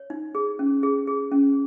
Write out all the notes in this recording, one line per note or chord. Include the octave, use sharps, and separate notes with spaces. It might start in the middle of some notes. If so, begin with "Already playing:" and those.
Already playing: C#5
D#4
G#4
C#4
G#4
G#4
C#4